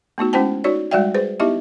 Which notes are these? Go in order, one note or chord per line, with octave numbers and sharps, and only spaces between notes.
A3 B3 D#4 F#4
G#3 C#4 E4 C5 G5 A5
D#4 F#4 C#5 D5
G3 G#3 F#4 D5 E5 G5
G#4 B4 C5
B3 D#4 E4 G4 D#5 E5